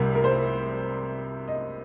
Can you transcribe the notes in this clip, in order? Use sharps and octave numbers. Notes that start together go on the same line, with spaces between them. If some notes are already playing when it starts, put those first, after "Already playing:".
Already playing: C2 C3 G3 A#4
A#4
C5
D#5